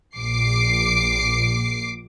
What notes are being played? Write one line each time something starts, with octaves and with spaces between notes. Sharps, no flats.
A#1 D6 C7